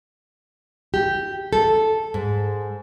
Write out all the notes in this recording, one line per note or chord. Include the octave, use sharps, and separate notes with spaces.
G4
A4
G#2